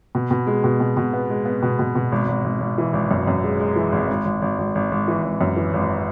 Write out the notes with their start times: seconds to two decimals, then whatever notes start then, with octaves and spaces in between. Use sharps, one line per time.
0.15 B2
0.31 B2
0.47 G#3
0.64 B2
0.80 B2
0.97 B2
1.13 B3
1.30 G#3
1.45 B3
1.63 B2
1.79 B2
1.95 B2
2.12 G#1
2.28 G#1
2.44 G#1
2.60 G#1
2.78 E3
2.93 G#1
3.11 F#2
3.27 F#2
3.44 G#3
3.60 G#3
3.76 E3
3.92 G#1
4.09 G#1
4.25 G#1
4.42 G#1
4.59 G#1
4.75 G#1
4.92 G#1
5.08 E3
5.24 G#1
5.41 F#2
5.56 E3
5.74 G#1